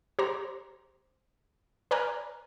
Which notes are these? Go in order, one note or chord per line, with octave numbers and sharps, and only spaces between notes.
G4 C5 A#5 C6
B4 D5 G#5 A#5 F6 F#6